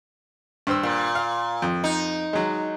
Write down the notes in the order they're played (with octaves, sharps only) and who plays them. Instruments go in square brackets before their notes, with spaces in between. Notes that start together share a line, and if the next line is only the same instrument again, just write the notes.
[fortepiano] G2 C5 E6
[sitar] A#2
[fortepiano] F5
F2
[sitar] D#4
[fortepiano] F#3 G#3